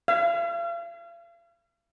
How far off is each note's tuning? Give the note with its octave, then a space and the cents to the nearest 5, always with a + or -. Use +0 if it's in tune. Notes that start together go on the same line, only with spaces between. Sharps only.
F5 -45